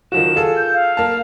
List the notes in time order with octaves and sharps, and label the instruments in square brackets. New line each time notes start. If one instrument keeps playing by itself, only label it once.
[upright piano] D#3 F3 F#4 [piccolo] E7
[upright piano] F4 G#4 A4
[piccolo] G6
F5
[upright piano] A#3 A5